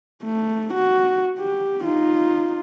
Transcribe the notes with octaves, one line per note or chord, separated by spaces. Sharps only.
A3
F#4
G4
D#4 F4